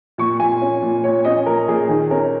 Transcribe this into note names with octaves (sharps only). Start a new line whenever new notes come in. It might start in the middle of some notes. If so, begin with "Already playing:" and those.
A#2 C#6
A#2 G#5
C#4
A#2
A#2 C#5
C#4 D#5
A#2 A#4
A#2 G#4
D#3 G#4
C#4 A#4